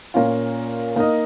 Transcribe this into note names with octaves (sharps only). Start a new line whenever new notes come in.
A#2 A#3 C#4 F4
A#3 D#4 A#4 D#5